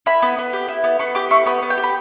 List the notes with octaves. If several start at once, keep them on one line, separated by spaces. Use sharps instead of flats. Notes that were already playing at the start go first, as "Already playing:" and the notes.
E4 B5
B3
B3
G4
E4
B3
B3 C#6
G4 D6
E4 C#6
B3 B5
B3
G5
G4
B5